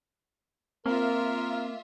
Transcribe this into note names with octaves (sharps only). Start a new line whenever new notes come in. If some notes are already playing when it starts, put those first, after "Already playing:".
A#3 C4 F4 A#4 E5